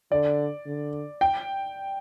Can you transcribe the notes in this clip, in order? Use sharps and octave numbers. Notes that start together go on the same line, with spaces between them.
D3 D5
D3
G5